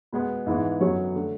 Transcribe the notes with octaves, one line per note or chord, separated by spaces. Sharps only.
B2 G#3 B3
G#2 E3 G#3 B3
F#2 D3 F#3 B3 C#5
D3 A3